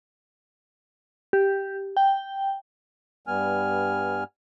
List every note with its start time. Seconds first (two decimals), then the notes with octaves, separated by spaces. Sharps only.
1.33 G4
1.97 G5
3.27 G2 G3 B3 G#5 F6